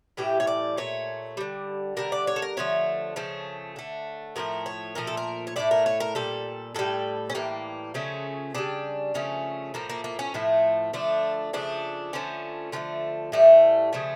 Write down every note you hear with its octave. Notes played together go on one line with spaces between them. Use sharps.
A2 E3 G3 G4
C#5
D5
A#2 A3 C#5
D3 G3
D3 G3 A#4
D5
C#5
A4
A#4
D3 F3 A3 C#5
C#3 F3 A3
D3 A3
A2 F3 A3 A#4
C#5
A#2 F3 A3 A#4
A4
A#4
C#5
A2 F3 A3 D5
A#4
C#5
A#4
A#2 G3 A4
A2 G3 A4
C#4
A2 E3 G3 A#3
C#3 F3 A3 C#4
C#3 G3 D4
C#3 F3 A3 C#4
A2 F3 A3 A#3
A#3
A#3
C#4
A2 F3 A3
D3 F3 A3 D4
C#3 F3 A3 D4
D3 F3 A3 C#4
D3 F3 A3 C#4
A2 E3 G3 A3
C#3 F3 A3